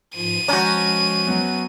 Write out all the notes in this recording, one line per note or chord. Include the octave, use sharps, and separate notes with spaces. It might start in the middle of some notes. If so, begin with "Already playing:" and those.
G#2 F3 F4 D#7
F3 G#3 C#4 F#4 A5 A#5 G6
F#3 B3